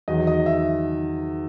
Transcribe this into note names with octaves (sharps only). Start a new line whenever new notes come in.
E2 D#3 F#3 D#5
D#5
E5